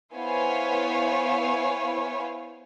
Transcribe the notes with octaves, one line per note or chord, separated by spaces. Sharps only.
B3 E4 C5 C#5 F5 G#5